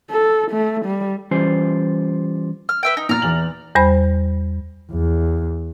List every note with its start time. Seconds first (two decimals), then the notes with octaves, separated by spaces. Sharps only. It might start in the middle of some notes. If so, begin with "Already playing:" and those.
0.11 A4
0.51 A3
0.85 G3
1.31 E3 G3 C#4 F4 G4 C5
2.69 F6
2.83 B4 E5 G5
2.97 D#4
3.09 A#2 A#5 F6 A6
3.22 E2 E3 F#7
3.75 E2 G3 C5 B5
4.91 E2